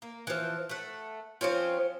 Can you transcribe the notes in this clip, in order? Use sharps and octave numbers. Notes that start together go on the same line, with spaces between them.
A#3
E3 F3
A3 F#5
F3 C4 C#4 F4